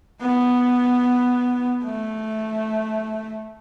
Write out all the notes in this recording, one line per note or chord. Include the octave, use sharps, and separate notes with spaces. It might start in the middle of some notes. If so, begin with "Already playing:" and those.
B3
A3